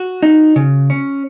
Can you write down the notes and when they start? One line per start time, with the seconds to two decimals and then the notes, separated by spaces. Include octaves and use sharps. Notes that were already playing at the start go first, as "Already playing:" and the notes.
Already playing: F#4
0.23 D#4
0.56 C#3
0.90 C#4